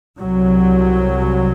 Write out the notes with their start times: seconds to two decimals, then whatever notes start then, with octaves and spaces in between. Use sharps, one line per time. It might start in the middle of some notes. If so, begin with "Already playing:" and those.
0.18 C2 C3 F#3